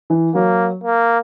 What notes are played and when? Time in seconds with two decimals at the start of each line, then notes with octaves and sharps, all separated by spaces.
0.10 E3
0.34 F#3 A#3
0.84 A#3